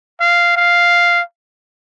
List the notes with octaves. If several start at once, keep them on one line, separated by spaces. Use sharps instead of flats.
F5
F5